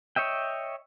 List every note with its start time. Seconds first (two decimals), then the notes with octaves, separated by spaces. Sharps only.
0.16 C#5 D#5 E5 G5